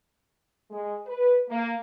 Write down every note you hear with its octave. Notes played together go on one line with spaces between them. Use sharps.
G#3
B4
A#3